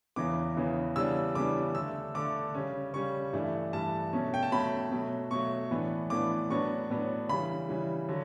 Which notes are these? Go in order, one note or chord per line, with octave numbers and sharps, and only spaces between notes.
E2 C#3 E3 B3 D6
E2 C#3 E3 B3
C#3 E3 G3 B3 D4 E6
C#3 E3 G3 B3 D4 D6
D3 A3 D4 E6
D3 A3 D4 D6
C#3 G3 C#4
C#3 G3 C#4 C#6
G2 E3 A3 D4
G2 E3 A3 D4 A5
B2 F#3 A3 C#4
G5
A5
B2 F#3 A3 C#4 B5
B2 F#3 A3
B2 F#3 A3 C#6
A2 E3 B3 D4
A2 E3 B3 D4 D6
A2 F#3 B3 D4 C#6
A2 F#3 B3 D4
C#3 E3 G3 B5
C#3 E3 G3
D3 F#3